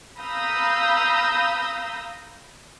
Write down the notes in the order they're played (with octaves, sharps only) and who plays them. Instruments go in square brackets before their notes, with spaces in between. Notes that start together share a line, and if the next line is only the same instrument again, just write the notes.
[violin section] F5 A#5 B5 D#6 E6 G6